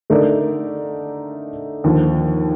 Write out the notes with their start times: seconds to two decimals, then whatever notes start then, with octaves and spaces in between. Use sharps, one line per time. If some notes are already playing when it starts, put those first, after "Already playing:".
0.10 D3 A3 D#4 A#4 D5
1.84 D#2 D3 F3